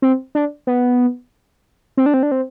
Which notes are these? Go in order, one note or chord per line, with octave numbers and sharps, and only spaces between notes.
C4
D4
B3
C4
D4
C4
D4
C4